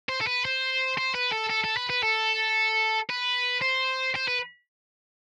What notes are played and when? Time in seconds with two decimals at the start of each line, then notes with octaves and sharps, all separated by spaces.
0.09 C5
0.21 A4
0.27 B4
0.45 C5
0.98 C5
1.15 B4
1.32 A4
1.50 A4
1.64 A4
1.77 B4
1.90 B4
2.03 A4
3.10 B4
3.62 C5
4.16 C5
4.28 B4